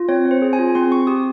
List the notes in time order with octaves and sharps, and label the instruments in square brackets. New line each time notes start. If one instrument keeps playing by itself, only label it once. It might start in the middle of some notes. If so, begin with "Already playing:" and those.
Already playing: [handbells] F4
C4 C#5
C4
C5
G#4
G#5
F4
C4 C6
C4 C#6
G4 D#6